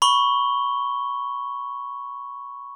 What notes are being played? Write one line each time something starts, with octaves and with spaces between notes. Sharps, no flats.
B5 C#6 G7